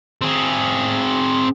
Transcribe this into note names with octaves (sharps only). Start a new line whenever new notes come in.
C4 G#4